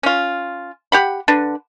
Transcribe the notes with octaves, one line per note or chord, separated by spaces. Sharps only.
C#4 F4
G4 F#5 B5
D3 D4 B4